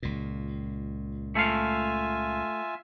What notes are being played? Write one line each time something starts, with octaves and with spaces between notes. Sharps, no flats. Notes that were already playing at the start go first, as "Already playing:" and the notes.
C#2 A#2
A3 F4 E5 F5 G#5